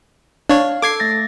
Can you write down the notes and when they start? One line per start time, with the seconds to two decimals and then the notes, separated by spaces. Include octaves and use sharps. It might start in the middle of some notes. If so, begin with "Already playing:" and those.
0.49 D4 C#5 F5
0.82 A4 D6 G#6 C7
1.00 A3 A6 A#6